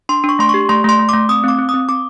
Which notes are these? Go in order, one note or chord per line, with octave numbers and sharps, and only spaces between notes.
D4 C6
D4
C#6
A3 C6
C#6
G4
A3 C6
A3 C6
A3
D6
A3
C4 D#6
C4 D6
C4
D#6
C4
C4 D6